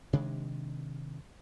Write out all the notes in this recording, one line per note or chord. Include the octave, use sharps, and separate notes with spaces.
C3 D#3 G#3 D4